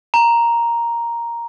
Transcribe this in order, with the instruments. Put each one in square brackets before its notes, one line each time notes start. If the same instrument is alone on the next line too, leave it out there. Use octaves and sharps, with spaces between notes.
[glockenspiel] A#5